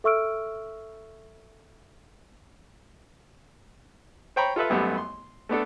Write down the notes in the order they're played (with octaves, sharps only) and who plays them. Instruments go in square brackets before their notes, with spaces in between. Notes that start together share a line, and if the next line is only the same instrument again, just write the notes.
[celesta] A4 E5 C#6 E6 F6 D7
[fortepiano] C5 C#5 G5 A#5 B5 C#6
F4 A4 B4 E5
G#1 F#2 G3 A3 B3
C6
A3 B3 D4 A4